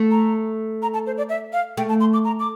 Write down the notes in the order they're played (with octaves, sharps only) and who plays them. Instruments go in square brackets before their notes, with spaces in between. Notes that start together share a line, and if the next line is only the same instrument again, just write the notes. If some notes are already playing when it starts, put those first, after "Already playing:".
Already playing: [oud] A3
[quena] A#5
A#5
A5
C5
D5
E5
F5
[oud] A3 [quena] G5
[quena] A5
C6
D6
A#5
D6